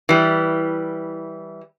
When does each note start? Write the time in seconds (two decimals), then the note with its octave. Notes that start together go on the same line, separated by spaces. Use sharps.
0.09 E3 G3